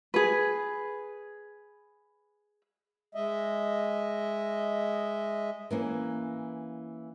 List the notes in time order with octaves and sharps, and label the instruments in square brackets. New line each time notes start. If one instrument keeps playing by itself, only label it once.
[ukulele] G#4 B4
[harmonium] G#3 D#5 E5
[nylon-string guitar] E3 A#3 C#4